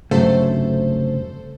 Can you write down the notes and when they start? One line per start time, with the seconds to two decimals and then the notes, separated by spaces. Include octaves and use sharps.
0.11 F1 G2 C#3 F#3 A3 A4 C5